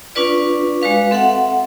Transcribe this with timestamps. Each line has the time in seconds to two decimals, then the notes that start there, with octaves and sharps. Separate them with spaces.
0.15 C#4 D4 F4 B4 D5
0.82 G#3 F#4 B4 F5
1.11 C4 A4 E5 F#5